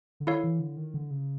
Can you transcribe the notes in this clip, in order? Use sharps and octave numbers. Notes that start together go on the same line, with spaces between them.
D3
D#3 E4 A4 C#5 F5
E3
D3
D#3
D3
C#3